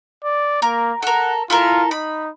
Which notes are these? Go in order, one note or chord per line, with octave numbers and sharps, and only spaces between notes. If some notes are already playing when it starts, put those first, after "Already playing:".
D5
A#3 A#4
A4 A#4 F#5
E4 F4 A4 A#4
D#4 B5